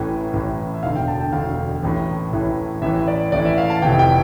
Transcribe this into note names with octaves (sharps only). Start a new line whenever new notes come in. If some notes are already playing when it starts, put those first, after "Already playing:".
Already playing: A1 A2 E3
A1 A2 E3
E5
E1 D2 D3 F5
G5
A5
G5
E1 D2 D3 F5
A1 A2 E3
A1 A2 E3
A1 A2 E3 E5
D5
A1 A2 E3 D5
E5
F5
A5
F1 F2 E3 G5
G5